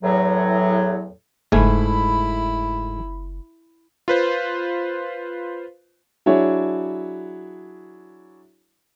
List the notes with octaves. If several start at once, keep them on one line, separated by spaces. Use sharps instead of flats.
E2 A2 F#3
F#1 G#2 A3 E4 G#5 B5
F4 B4 C5
F#3 D4 E4 F#4 G#4 C#5